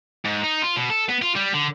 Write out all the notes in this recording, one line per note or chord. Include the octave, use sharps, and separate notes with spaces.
G#2
D#4
F4
B2
A4
B3
F4
G3
D3